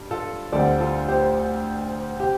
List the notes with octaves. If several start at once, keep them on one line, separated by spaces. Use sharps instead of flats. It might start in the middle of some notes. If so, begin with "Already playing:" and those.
Already playing: G2
F4 A4
D2 D3 G3 C4 A4 D5
F4 A4
G4 C5
C3 G4